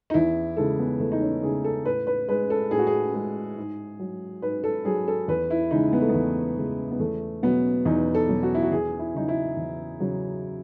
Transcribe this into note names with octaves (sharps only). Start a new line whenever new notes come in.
D#4
E2 E4
C#3 E3 G#3 A4
B3
E2 A3
D#4
C#4
C#3 E3 G#3 G#4
A4
A2 B4
B4
G#3 B4
A4
A2 G#4
F#4
G#4
G#3
G#2
F#3
G#2 B4
A4
F#3 G#4
A4
E2 B4
E4
C#3 E3 G#3 D#4
B3
A3
E2 B3
C#3 E3 G#3
B3
E2 A3
B2 F#3 B3
E2 D#4
A4
B2 F#3
F#4
E4
F#4
E2 G#4
E4
C#3 F#3 D#4
E4
E2
C#3 F#3